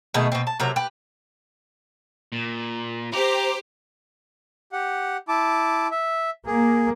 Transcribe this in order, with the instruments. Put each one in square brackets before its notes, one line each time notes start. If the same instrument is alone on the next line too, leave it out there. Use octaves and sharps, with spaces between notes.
[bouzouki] B2 D#3 A3 G#4
B2 C4
A5
C3 F#3 A#4
G4 B4
[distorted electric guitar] A#2
[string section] G4 C5 [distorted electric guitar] A#5
[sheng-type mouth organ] G4 F#5
E4 A5 D6
E5
[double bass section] A#3 [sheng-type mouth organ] G#4